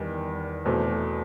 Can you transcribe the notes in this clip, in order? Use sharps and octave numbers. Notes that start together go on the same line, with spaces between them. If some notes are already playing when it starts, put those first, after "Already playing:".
Already playing: E2 D#3 G3
E2 B2 A3 C4